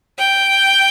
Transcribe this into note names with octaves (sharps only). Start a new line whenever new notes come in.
G5